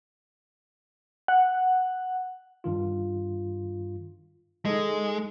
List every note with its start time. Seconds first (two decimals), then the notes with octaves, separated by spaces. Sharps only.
1.28 F#5
2.64 G2 D#3 F4
4.65 G#3 D#4 A4 D#5